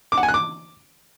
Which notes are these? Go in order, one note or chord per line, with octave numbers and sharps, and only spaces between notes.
D6
F#5
G#5
F#6
D6